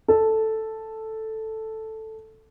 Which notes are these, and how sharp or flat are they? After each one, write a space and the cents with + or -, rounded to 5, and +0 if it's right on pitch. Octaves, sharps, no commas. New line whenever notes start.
A4 +0